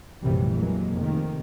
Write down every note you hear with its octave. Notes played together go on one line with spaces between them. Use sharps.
A#1 F#2 C3 E3 G3 A3
F2 E3 F#3 G#3 A#3
F1 C3 D#3